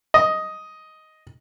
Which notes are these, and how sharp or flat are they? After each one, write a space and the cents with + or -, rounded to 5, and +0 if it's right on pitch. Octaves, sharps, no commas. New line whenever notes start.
D#5 +5